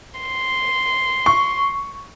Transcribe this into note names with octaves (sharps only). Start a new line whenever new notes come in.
C6
C#6